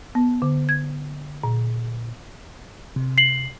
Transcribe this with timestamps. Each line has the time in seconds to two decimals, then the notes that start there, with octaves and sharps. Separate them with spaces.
0.15 B3
0.42 D3
0.69 G#6
1.43 A#2
2.96 C3
3.18 C7 F#7